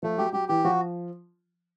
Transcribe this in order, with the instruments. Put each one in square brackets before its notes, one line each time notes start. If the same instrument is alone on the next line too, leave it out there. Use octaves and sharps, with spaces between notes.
[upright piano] F3 [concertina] A3
[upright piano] F#3 [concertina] G4
[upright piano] F#3 [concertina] G4
[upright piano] E3 [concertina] G4
[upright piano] F3 [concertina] F#4